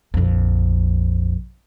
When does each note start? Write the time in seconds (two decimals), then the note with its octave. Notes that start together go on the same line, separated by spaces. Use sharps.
0.14 A#1 F2